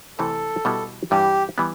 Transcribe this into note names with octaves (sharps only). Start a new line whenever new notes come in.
C3 E3 A3 C4 E4 A4
B2 G3 B3 E4
G2 E3 G3 G4
E3 G3 B3